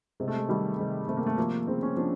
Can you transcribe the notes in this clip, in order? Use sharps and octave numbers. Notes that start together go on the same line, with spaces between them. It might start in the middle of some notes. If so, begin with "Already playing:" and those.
C3 G#3
A3
G#3
D#3 G3
C3 G#3
C3 A3
A#3
A3
F3 A#3
C#3 C4
C#4
F3 D4